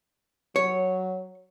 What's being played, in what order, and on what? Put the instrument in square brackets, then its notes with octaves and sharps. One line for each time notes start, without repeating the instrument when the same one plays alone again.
[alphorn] F#3 [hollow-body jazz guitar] C#5